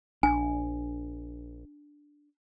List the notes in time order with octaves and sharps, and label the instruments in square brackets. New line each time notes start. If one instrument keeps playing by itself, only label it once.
[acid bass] A#1 [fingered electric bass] D4 [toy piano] G#5